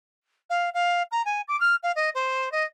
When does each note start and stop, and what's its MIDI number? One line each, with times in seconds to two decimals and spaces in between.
0.50 0.70 77
0.74 1.03 77
1.11 1.22 82
1.25 1.41 80
1.48 1.58 86
1.60 1.75 89
1.83 1.92 77
1.96 2.10 75
2.14 2.52 72
2.52 2.64 75